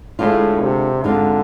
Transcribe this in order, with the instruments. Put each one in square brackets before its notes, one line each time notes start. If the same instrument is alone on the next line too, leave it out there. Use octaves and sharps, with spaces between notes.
[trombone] A2 [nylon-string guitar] D3 G#3 D4 F4
[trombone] C3
[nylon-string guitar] G#2 G#3 C4 F4 [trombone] D3